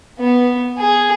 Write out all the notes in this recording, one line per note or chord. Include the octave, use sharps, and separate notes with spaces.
B3
G#4